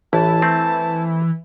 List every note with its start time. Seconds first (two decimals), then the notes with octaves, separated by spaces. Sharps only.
0.13 A1 E3 A5
0.42 A3 C4